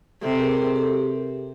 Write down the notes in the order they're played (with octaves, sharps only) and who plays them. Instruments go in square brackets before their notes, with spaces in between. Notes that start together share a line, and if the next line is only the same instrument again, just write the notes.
[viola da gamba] C3 [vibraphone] G4 A4
[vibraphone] G#4 A#4
G#4 A#4
G4 A4